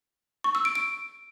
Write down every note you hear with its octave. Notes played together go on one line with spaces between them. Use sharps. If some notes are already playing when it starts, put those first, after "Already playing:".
C#6
E6
D7
D7